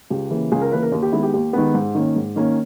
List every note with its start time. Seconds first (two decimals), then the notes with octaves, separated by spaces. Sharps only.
0.10 C#2 G4
0.31 C#3 E3 A#3
0.52 C#2 G#4
0.61 A#4
0.72 C#3 E3 A#3 B4
0.83 A#4
0.92 D#2
1.02 G4
1.13 D#3 G#3 B3 E4
1.23 G4
1.34 D#2 G4
1.53 D#3 G#3 B3
1.74 G#2
1.95 D#3 A#3 C#4
2.16 G#2
2.36 D#3 A#3 C#4